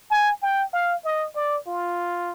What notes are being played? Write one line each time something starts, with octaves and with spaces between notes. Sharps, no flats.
G#5
G5
F5
D#5
D5
F4